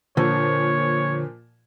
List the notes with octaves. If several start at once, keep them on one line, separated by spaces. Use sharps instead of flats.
A#2 D3 F3 C#5